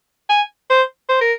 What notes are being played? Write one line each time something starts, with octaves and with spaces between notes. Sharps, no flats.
G#5
C5
C5
A#4